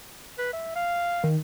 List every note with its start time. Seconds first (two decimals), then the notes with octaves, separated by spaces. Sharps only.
0.39 B4
0.53 E5
0.76 F5
1.24 D#3